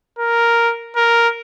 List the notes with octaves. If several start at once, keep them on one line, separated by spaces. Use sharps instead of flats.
A#4
A#4